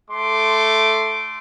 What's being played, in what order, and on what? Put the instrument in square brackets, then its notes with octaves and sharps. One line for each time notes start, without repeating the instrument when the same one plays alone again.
[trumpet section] A3 C6 D6